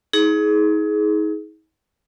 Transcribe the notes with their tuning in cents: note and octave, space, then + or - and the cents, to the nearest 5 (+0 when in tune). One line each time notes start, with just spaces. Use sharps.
D#4 +40 G#4 +20